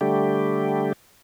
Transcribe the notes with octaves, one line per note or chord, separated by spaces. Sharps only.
D3 G3 A3 G4